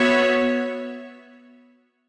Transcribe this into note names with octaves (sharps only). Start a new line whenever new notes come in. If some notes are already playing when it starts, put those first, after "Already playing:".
Already playing: B3 F#4 C#5 E5